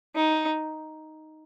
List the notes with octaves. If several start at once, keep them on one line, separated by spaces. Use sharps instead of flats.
D#4